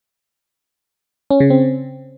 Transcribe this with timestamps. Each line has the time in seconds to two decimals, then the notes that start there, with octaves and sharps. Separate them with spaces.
1.30 C#4
1.40 C#3
1.50 C4